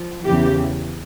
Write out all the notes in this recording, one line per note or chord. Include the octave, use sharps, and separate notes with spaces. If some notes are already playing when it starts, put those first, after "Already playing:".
Already playing: F3
E2 C#3 E3 G4